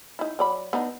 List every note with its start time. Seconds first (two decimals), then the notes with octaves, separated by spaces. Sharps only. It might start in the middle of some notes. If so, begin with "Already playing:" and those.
0.19 D#4 E4
0.39 F#3 D5 B5
0.73 B3 D4 D#4